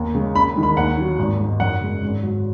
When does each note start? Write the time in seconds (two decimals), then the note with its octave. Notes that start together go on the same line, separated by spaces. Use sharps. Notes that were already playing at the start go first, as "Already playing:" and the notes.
Already playing: D#2
0.14 C#3 G#3
0.35 D#2 B5
0.55 D#3 G#3
0.63 B5
0.77 D#2 F#5
0.98 D#3 F#3
1.19 G#1
1.40 G#2 G#3
1.60 F#2 F#5
1.81 C#3 G#3
2.03 G#1
2.23 G#2 F#3